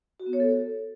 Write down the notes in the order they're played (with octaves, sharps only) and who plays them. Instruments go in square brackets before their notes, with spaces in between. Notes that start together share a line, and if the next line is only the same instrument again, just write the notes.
[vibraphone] F#4
B3
C#5
A4